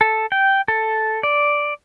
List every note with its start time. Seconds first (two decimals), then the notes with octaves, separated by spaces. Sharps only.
0.01 A4
0.32 G5
0.68 A4
1.23 D5